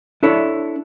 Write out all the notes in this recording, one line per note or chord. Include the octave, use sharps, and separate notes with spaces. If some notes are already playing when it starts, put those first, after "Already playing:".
D4 E4 A4 C#5